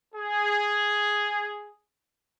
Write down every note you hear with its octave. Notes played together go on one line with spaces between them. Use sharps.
G#4